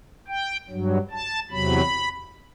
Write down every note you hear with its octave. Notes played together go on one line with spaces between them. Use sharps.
G5
G2 F#3
A5
E2 C3 F#3 B5